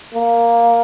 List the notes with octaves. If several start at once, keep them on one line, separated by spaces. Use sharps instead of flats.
A#3